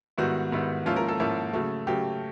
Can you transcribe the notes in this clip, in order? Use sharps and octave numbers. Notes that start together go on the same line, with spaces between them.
G#2 D#3 G3 B3 E4 F#4
G#2 D#3 G3 B3 E4
G#2 F3 A#3 C#4 E4 F4
A#4
A4
G#2 F3 A#3 C#4 E4
C#3 F#3 A3
C#3 F#3 A3 G4